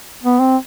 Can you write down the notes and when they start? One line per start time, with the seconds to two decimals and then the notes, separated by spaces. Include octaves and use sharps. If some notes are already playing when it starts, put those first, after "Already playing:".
0.23 B3
0.39 C4